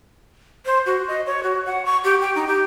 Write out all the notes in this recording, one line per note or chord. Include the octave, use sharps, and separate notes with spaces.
C5
F#4
D#5
C#5
F#4
F#5
C#6
G4
G5
D#4
G4